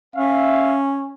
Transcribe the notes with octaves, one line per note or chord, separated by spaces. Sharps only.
C#4 E5 F5